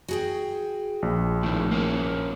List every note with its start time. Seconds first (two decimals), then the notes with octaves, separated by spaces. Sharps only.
0.08 F#4 G#4 G5
1.02 A#1
1.43 A2 D#3
1.71 A#3 C#4